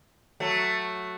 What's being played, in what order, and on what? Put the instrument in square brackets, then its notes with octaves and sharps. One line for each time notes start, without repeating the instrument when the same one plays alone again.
[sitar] F#3 A3